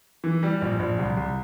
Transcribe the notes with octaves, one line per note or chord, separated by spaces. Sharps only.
E3
G3
A#1
A#1
C2
C2